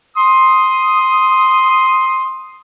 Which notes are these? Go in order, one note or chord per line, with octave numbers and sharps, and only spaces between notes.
C6 D#6